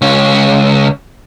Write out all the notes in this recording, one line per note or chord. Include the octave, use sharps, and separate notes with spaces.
C#2 C#4